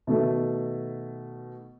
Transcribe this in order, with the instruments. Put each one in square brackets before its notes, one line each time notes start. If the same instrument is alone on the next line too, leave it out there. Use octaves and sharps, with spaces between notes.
[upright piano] B2 D#3 A3